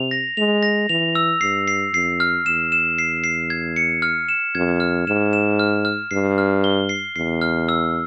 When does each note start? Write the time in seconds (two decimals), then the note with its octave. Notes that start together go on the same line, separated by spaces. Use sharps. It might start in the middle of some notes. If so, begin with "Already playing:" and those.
Already playing: C3 F7
0.11 A#6
0.37 G#3 F7
0.63 A#6
0.89 E3 F7
1.15 E6
1.41 G2 C7
1.68 C7
1.93 F2 C7
2.20 F6
2.46 E2 E7
2.72 E7
2.98 C7
3.24 C7
3.50 G#6
3.76 C#7
4.02 F6
4.29 E7
4.55 F2 G#6
4.80 F6
5.07 G#2 E7
5.33 E7
5.59 F6
5.85 F6
6.11 G2 C7
6.38 F6
6.64 G7
6.89 C7
7.16 E2 C7
7.41 F6
7.69 E6